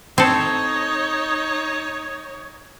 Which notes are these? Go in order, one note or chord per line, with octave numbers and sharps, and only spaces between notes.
C4 D#4 A4 C#5